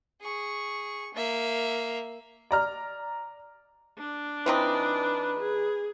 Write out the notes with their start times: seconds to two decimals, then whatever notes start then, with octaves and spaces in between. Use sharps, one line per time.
0.22 G#4 C#6
1.14 A#3 E5
2.51 D5 A#5 F6
3.98 D4
4.46 E3 C4 D#4 B4
5.40 G#4